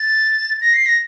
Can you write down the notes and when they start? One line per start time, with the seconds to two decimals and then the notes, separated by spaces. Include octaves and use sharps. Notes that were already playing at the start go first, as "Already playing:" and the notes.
Already playing: A6
0.61 A#6
0.74 C7
0.86 A#6